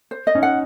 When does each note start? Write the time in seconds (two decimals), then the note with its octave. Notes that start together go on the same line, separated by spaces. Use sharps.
0.11 C5
0.27 D#5
0.35 C#4 D#4
0.43 F#5